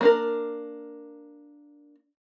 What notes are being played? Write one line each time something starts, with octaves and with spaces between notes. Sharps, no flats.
A#3 D4 A#4